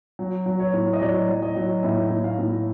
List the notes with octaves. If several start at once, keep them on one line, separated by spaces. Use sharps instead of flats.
F#3
F#3
C#5
A2
D#5
F#3 D5
F#3
D#5
F#3
A2 E5
A2
F5
A2